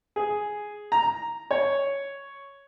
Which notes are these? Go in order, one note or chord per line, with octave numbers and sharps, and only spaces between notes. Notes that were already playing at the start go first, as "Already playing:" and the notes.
G#4
A#5
C#5